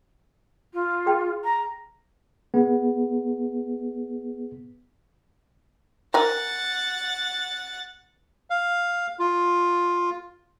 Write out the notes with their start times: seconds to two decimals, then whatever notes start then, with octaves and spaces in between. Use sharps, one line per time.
0.74 F4
1.06 G#4 G5
1.44 A#5
2.54 B3 G#4
6.14 A#4 F#5 G#5 A6
8.50 F5
9.19 F4